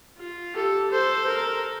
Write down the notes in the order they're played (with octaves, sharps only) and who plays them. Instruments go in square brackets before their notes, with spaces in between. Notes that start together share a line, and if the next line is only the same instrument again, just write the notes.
[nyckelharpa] F4
[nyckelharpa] G4 [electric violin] A4
[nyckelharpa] A4 [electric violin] C5
[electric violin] A#4